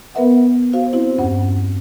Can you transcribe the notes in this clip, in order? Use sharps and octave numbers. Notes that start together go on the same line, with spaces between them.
B3 A#4 B4 E5 F#5
F#4 C5 F5
C4 E4 F#4 C5
E2 G2 C#4 F#5